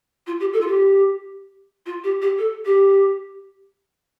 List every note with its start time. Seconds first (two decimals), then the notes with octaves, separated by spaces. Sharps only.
0.27 F4
0.40 G4
0.53 A4
0.61 F4
0.68 G4
1.86 F4
2.04 G4
2.22 G4
2.38 A4
2.65 G4